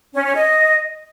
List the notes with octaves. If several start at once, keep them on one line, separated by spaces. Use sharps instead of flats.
C#4
C#4
D#5